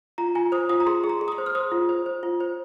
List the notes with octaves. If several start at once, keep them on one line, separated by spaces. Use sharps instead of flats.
F4 A#5
F4 G#5
C5 D#6
F4 D#6
A#5
G#4 C6
G#4
A#5
G#4
D#6
C6
C5
F6
C5 D#6
F4
C5
C5
F4
C5